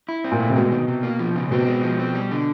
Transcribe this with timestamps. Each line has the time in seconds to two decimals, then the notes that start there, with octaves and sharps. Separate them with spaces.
0.09 E4
0.24 C4
0.32 A#2
0.40 A3
0.50 C3
0.55 B2 G#3
0.72 D#3
0.88 C3
1.03 A#3
1.19 F3
1.36 C#3
1.51 B2 C4
1.67 G#3
1.83 F3
1.99 C4
2.15 G3
2.31 D3